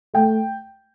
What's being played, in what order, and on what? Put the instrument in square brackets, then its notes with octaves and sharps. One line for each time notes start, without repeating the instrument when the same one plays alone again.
[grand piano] A3 G5